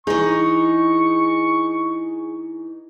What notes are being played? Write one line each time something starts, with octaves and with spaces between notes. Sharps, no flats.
E3 D#4 G#4 C#6